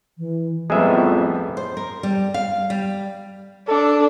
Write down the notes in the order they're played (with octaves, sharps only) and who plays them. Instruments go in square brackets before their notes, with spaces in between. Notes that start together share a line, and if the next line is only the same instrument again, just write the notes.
[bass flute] E3
[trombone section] A1 F2 [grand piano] F3 G3 B3 [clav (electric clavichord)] G#3 G#4 E5
[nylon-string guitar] C5
A#4
G3
F5
G3
[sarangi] D4 [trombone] A4